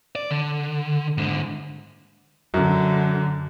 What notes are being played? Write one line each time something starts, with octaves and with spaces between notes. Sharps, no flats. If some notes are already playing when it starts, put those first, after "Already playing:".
D5
D3
G#2 D3
F#2 D3